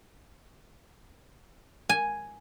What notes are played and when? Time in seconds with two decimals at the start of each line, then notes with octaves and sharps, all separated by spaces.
1.89 G#5